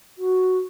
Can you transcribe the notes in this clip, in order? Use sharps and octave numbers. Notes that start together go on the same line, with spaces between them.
F#4